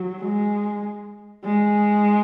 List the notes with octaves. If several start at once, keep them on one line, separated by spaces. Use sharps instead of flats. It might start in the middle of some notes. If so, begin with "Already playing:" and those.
Already playing: F#3
G#3
G#3